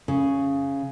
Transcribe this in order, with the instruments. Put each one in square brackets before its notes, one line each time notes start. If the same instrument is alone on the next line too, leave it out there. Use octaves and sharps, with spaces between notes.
[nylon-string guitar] C#3